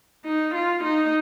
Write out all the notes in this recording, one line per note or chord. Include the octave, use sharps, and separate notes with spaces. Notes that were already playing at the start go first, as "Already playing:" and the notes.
D#4
F4
D#4